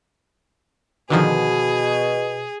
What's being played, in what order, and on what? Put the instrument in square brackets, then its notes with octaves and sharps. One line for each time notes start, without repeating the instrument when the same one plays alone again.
[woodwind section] B2 [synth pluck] D3 D#3 F3 [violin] G#4